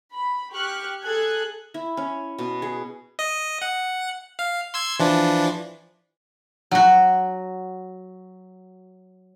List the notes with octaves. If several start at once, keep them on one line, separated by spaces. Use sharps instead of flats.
B5
G4 C#6 F6 F#6
G#4 A4 F#6 G#6
E4
C#4
B2
G#4
D#5
F#5
F5
C6 E6 G#6
E3 F3 D4
F#3 F#4 F#5